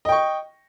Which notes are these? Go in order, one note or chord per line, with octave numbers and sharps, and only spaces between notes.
D#5 G5 C#6